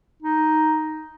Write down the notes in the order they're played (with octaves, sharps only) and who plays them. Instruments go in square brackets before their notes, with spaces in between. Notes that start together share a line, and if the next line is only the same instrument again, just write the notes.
[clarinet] D#4